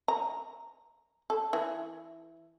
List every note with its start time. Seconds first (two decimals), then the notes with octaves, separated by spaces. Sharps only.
0.08 A#5
1.30 A4
1.53 E3